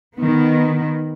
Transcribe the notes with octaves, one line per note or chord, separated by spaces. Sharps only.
D#3 B3